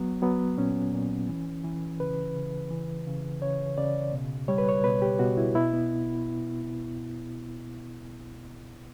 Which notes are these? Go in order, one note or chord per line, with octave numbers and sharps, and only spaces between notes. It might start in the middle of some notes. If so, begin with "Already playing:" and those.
Already playing: F#3 B3
F#3 B3
A#2 C#4
A#2
E3
E3
C#3 B4
C#3
E3
C#3
C#3 C#5
C#3 D5
B2
G3 C#5
B4
C#5
B2 B4
G4
B2 F#4
E4
B2 E4
B3